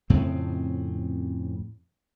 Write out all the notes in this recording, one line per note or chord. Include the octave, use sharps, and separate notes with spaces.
F2 A2 C#3 C4